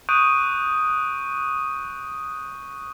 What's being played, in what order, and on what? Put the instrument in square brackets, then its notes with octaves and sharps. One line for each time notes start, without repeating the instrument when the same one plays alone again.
[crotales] C#6 D#6 F#6 G6 D7 D#7